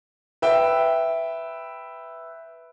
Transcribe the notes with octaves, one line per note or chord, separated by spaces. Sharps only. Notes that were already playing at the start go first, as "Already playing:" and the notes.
B4 E5 G5